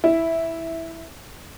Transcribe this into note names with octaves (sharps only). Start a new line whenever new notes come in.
E4